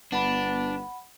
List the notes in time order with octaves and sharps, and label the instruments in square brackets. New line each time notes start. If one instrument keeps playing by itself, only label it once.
[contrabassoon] G1 [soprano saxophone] B3 [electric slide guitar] D4 [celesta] F#5 B5